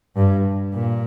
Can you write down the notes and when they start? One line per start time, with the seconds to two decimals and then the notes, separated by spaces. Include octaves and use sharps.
0.16 G2
0.74 A#2